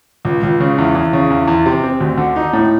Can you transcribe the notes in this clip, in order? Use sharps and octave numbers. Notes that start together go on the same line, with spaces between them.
C#2
C#2
C#3
E2
E2
C#3
E2
E2
C3
C4
D2
D3
D#4
A2